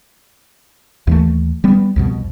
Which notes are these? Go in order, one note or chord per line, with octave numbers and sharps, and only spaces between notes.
D#2 E3 A3
G3 B3
C2 F2 B2